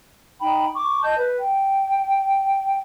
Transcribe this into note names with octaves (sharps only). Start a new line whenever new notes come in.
D#4 G5 B5
C#6 D6
D#5 A5 G6
B4
G5